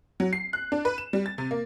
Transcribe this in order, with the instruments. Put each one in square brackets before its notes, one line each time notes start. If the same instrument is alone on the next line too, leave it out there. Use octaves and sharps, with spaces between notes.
[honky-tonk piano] F#3
C7
F#6
D4
B4
E7
G3
A6
C3
A#3